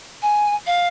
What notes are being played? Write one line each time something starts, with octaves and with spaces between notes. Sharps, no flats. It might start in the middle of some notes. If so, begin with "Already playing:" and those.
G#5
F5